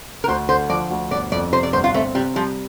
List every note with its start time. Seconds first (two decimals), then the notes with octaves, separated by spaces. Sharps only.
0.24 A#4
0.28 D2 C5
0.49 D3 C5
0.69 F3 D5
0.90 D2
1.11 G1 D5
1.32 F2 D5
1.53 C3 C5
1.63 D5
1.73 G1 C5
1.84 F4
1.94 A3 C4
2.15 C3 G3
2.36 F3 G3